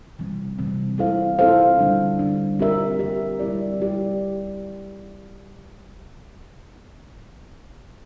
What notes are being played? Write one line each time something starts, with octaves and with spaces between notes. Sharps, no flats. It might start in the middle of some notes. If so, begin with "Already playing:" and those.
C3 E3 G3 C4
C3 E3 G3 C4
C4 E4 A4 C5 F5
C4 E4 A4 C5 F5
D3 G3 D4
D3 G3 D4
C4 G4 A#4 E5
C4 G4 A#4 E5
G3 C4 E4 G4 D5
G3 C4 E4 G4 D5